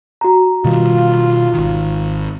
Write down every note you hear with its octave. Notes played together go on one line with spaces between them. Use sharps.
F#4 A#5
B2 D#3 G3 F4
G#1 D#3